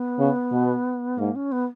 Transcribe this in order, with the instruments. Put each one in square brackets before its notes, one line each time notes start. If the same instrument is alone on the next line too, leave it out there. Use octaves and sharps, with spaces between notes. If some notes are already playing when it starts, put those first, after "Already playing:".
Already playing: [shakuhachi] B3
[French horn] C#3
B2
[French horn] G#2 [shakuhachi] A#3
[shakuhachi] C#4
B3